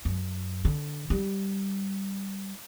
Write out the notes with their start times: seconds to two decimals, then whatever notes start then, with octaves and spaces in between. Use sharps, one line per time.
0.05 F#2
0.65 D3
1.10 G3